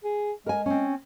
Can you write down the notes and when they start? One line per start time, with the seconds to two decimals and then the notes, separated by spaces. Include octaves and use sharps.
0.04 G#4
0.46 G#3 A#4 G#5
0.66 C4 C#4